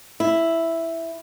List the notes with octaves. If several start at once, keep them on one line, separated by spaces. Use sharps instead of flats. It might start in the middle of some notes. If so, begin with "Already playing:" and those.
E4